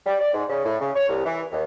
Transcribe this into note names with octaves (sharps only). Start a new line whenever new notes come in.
G3
D5
G#2
C#3
A2
C#3
C#5
C2
E3
D#2